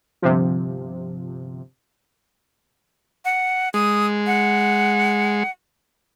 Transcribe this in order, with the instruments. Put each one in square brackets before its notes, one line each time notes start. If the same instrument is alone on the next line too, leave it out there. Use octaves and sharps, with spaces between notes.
[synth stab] G1 C3 F3
[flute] F#5
[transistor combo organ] G#3 [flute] D#6
[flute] F#5